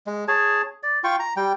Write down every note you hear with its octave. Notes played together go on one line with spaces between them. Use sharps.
G#3
G#4 C#5 A5
D5
F4 G5 C#6
A#5
G3 G5